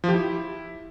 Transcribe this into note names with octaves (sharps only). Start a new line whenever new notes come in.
F3
G4
E4